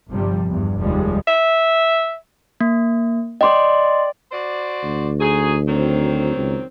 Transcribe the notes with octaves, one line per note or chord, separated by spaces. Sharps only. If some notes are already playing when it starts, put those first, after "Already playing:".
G1 C3 F3 G3
E2 G2
F1 D#2 F3 G3 G#3
E5
A#3
D5 D#5 G5 C6
F#4 C5 D5
D2
D#4 F#4 G#4
D#3 F#3 C4
C#2